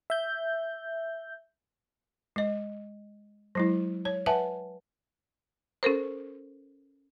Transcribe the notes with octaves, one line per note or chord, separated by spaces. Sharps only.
E5 G6
G#3 D#5
F#3 G#3 E4
C#5
B4 E5 F#5 G#5 A5
C#4 A4 A#4 C5